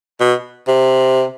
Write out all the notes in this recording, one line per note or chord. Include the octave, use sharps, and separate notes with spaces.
B2
C3